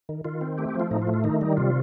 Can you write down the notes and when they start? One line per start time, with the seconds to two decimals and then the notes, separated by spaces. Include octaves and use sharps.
0.09 D#3
0.25 D#3 F4
0.41 C4
0.58 A3 G4
0.69 G4
0.75 F3 F4
0.91 A2 D#4
1.02 F4
1.07 A3
1.14 F4
1.24 D#3 D#4
1.41 G3 D#4
1.57 C3 F4